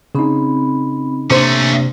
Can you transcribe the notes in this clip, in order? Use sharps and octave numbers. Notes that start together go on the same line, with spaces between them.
C#3 C4 D#4 B5
C3 A3 A#3 C#4 D4 C5